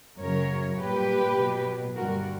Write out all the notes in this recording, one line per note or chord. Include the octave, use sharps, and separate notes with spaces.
F#2 C#3 F#3 A#4 C#5
A#2 G3 G4 B4
B2 F#3
G2 D3 G3 F#4 A#4